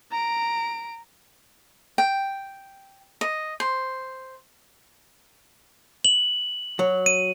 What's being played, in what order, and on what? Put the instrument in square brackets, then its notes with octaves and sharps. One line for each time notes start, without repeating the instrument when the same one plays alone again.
[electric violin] A#5 D7
[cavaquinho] G5
D#5
C5
[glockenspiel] F#7
[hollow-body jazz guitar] F#3
[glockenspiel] D#7